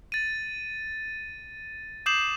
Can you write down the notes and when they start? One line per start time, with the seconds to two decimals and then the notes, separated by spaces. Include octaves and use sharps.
0.12 A6 D#7
2.06 D6 D#6 G6 C7 E7 F#7